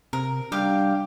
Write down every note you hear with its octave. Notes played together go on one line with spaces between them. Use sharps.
C3 A#4
G3 D4 G4 F5